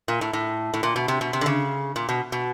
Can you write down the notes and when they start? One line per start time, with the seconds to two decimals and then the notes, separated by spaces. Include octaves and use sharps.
0.08 A#2
0.21 A2
0.33 A2
0.74 A2
0.83 A#2
0.96 B2
1.08 C3
1.21 B2
1.33 C3
1.41 D3
1.46 C#3
1.96 A#2
2.09 B2
2.32 B2